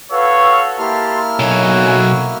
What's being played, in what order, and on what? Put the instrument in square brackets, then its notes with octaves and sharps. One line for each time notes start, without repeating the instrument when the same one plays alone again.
[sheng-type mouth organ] F#4 A4 [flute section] B4 F5 E6 [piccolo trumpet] C#5
[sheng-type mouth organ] A#3 E4 F6 [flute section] G4 C6 [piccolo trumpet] A5
[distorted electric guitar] B1 [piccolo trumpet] F#4 [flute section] C#5 G#5